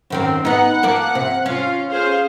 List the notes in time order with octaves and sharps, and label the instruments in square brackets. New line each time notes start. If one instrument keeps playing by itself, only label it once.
[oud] F#2 D#3 C4
[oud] B3 D#4 [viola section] F#5
[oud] F3 A#3 D5
C3
[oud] C#4 [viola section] F4 F5
[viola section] G#4 C5 F5